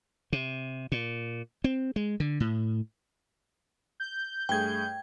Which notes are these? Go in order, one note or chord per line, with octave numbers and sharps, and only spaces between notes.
C3
A#2
C4
G#3
D3
A2
G6
G2 A3 G#4 G5 G#6